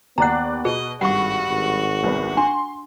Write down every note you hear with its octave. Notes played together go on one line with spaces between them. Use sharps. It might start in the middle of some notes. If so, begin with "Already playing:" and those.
D#2 B3 D5 F#5 A#5 F#6
B2 G#4 D#5
G#1 G2 F#4 F#5 C#6
G#1
C2 B3
D4 C6